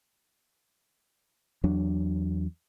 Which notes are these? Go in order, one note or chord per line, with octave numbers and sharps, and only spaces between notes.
E2 F#3 D4